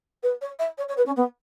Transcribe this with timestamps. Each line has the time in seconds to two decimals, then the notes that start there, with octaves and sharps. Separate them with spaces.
0.23 B4
0.41 C#5
0.59 E5
0.77 C#5
0.88 C#5
0.97 B4
1.05 C#4
1.16 B3